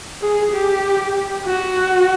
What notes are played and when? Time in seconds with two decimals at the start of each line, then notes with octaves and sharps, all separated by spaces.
0.21 G#4
0.52 G4
1.46 F#4